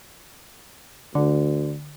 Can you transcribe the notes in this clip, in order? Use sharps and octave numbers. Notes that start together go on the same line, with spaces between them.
D2 D3